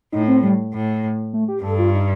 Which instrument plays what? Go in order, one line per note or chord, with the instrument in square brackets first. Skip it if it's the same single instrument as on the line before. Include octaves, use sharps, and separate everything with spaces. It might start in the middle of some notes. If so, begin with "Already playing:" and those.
[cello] A2 [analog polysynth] D#4
[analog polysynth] C4
G3
[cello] A2
[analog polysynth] A3
G4
[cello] G2 [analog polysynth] A4
[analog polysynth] F4
D#4